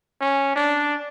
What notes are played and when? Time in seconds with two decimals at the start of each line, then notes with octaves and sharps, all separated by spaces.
0.21 C#4
0.56 D4